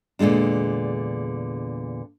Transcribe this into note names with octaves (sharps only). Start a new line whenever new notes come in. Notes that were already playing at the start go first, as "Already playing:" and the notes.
E2 A#2 D3 G#3 D4